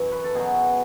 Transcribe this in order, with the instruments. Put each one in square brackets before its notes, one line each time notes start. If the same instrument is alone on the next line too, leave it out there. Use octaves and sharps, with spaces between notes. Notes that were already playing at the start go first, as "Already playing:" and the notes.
Already playing: [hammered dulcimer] F#2 E3 C#5
B4
A4
B2 F#3 G#4